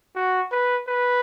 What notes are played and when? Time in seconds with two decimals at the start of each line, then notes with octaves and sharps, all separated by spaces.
0.16 F#4
0.52 B4
0.87 B4